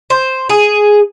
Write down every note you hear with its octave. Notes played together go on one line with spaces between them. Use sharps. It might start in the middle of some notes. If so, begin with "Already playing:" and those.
C5
G#4